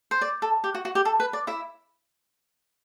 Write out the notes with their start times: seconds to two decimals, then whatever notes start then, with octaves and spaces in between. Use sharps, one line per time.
0.11 C5
0.21 D5
0.42 A4
0.64 G4
0.75 F#4
0.85 F#4
0.95 G4
1.05 A4
1.20 B4
1.33 D5
1.47 E4 E5